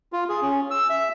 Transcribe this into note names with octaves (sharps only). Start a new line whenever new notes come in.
F4
G#4
C#4
E6
E5